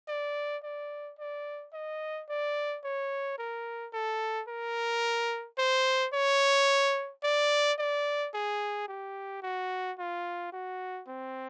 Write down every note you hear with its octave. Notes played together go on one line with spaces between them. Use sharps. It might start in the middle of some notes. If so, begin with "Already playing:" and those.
D5
D5
D5
D#5
D5
C#5
A#4
A4
A#4
C5
C#5
D5
D5
G#4
G4
F#4
F4
F#4
C4